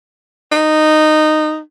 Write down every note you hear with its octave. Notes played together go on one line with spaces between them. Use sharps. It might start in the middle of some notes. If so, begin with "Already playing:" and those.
D#4